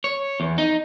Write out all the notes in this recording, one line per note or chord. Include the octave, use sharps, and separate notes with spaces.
C#5
E2
D#4